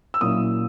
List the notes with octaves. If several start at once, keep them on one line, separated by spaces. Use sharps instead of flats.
E6
A#2 F#3 A#3 C#4 E4 D#6